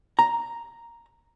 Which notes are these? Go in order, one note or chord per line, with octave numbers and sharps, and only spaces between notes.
A#5